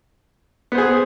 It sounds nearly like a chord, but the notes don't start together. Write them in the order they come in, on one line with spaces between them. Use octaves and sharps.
B3 C5 G#4